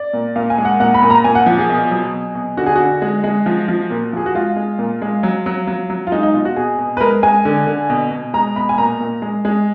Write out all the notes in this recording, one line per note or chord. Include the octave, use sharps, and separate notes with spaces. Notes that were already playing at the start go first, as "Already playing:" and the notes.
Already playing: D5
A#2
A#2 F5
G#5
G#3
F#5
A#2 F#5
B5
A#2
A#5
A#2 G#5
F#5
F3
G#4
B2
F#3
B2
B2
D3 F#4
G#4
D3 F#4
G#3
G#3
F3
F3
A#2
F3 G#4
F#4
G#3 F4
G#3
A#2
G#3
F#3
F#3
F#3
F#3
F4
G#3 D#4
D#4
B2 F4
F#4
B2 G#4
B2
B4
G#3 A#4
G#3 G#5
D3
D3
B2
B2
G#3 A#5
B2 B5
G#5
A#2 A#5
A#2
G#3
G#3